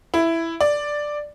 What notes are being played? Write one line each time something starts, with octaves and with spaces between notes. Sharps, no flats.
E4
D5